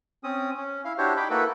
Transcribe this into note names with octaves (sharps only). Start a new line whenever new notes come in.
C4 C#4 D#6
C#4
E4 F5
D4 E4 F#4 G4 C5 C#5
D#4 G5 B5 D6
A#3 E4 F#4 A4 B4